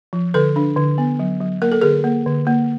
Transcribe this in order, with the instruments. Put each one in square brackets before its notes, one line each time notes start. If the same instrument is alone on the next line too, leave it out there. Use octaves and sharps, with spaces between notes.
[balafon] F3
D3 A4 B4
D4
D3
B3
F#3
F#3
A#3 A#4
A4
D3 G#4 A#4
A#3
D3
A#3